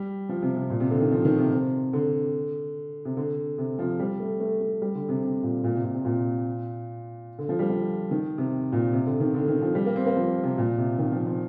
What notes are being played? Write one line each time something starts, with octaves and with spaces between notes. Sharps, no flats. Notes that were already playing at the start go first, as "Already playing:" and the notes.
Already playing: G3
F3
C3
C3
A#2
C3
D3
D#3
F3
D#3
C3
C3
D3
C3
D3
C3
F3
G3
A3
A3
A3
G3
D3
C3
C3
A#2
A#2
C3
A#2
C3
A#2
D3
F3
G3
F3
D#3
C3
A#2
C3
D3
D#3
D3
D#3
F3
G3
A#3
C4
A#3
F3
C3
A#2
C3
D#3
F3
F3